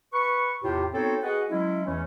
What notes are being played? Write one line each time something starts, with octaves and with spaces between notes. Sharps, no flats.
B4 C#6
E2 A2 C3 F4 G4
B3 C4 D#4 F#4 A4 C#5
F#4 G#4 B4 D#5 F#5
F#3 G#3 C#4 E4
E2 E3 A3 C#4